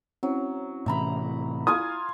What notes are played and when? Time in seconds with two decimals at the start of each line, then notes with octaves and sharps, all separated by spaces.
0.23 F#3 C4 C#4 E4
0.86 A2 C3 E3 E5 A#5 B5
1.67 E4 F4 F5 G#5 D#6